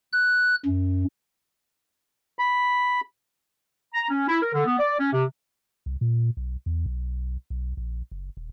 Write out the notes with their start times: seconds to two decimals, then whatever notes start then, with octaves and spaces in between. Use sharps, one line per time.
0.13 F#6
0.66 F#2
2.39 B5
3.94 A#5
4.10 C#4
4.28 E4
4.42 A#4
4.54 D3
4.66 B3
4.78 D5
4.99 C#4
5.12 C3
5.86 C2
6.01 A#2
6.37 B1
6.66 E2
6.86 B1
7.50 B1
7.77 A#1
8.11 F#1
8.37 D#1